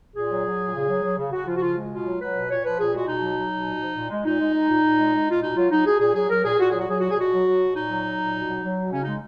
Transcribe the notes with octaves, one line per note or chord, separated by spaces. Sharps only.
A#2 G#4
F#3
F#3
A#2
C#3
F#3
F#3
C#3
C#3 F#4
F3 F4
F#4
C#3 F4
G#3
B2 F4
F#3
F#3 B4
B2
A#2 C#5
F3 B4
A#2 G#4
G#3 F#4
B2 D#4
F#3
F#3
B2
A#2
F3
A#2
G#3
A#2 D#4
G#3
G#3
A#2
A#2
G#3
G#3
A#2 F4
B2 D#4
F#3 F4
F#3 D#4
B2 G#4
A#2 G#4
F#3 G#4
F#3 A#4
A#2 G#4
A#2 F#4
F#3 G#4
F#4
F#3 G#4
A#2 F#4
G#4
B2 F#4
F#3
F#3
B2
A#2 D#4
F#3
F#3
A#2
B2
F#3
F#3
B2
C#3 C#4
G#3 D#4